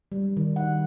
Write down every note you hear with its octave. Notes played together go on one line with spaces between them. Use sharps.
G3
D#3
F#5